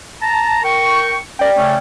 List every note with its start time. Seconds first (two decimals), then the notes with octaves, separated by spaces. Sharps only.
0.22 A5 A#5
0.63 A#4 G5 C#6
1.39 C#4 A#4 D5 G5
1.56 C#3 A3 C#4